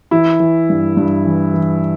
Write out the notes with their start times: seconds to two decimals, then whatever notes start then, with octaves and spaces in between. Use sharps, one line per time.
0.11 E3 E4
0.40 E3
0.70 G2
0.97 G2
1.25 E3
1.54 E3